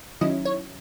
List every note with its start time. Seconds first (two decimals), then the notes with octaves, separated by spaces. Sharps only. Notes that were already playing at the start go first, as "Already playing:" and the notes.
0.21 D#3 F#3 C#4 E4 D#5
0.45 C#5